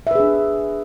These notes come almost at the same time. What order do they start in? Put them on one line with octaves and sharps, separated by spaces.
E5 B4 G#4 D4